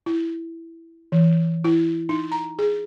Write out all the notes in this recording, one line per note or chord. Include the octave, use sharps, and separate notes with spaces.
E4
E3
E4
D#4
A#5
G#4